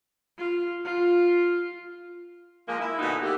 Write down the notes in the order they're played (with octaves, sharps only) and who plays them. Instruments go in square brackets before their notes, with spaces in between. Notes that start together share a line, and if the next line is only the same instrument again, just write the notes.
[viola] F4
F4
[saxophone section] F3 G#3 A#3
E4
A#2 D3 B3 D#4 F#4
E3 A#3 G4